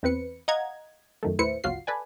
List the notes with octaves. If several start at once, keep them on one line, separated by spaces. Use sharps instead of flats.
E2 C4 B4 C#7
D#5 F5 F#5 A#5 G#6
F#2 D#3 A3
D#2 A2 E4 B4 C5 C#7
G1 C#2 F#3 F4 F#4 C7
A4 B4 D5 G#5